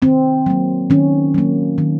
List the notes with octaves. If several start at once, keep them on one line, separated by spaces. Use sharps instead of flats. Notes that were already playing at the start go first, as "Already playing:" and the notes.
D#3 C4
F#3 A#3
D#3 C#4
F#3 A#3
D#3